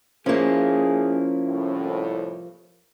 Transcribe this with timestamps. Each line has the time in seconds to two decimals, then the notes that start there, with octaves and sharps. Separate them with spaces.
0.26 F3 A#3 C#4 E4 G#4
1.46 C2 A2